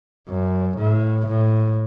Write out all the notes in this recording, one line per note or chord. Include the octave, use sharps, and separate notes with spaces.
F#2
A2
A2